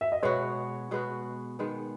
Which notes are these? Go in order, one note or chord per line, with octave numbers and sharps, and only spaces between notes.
E5
D#5
B2 G#3 B3 F#4 C#5
B2 G#3 B3 F#4
D#3 G#3 B3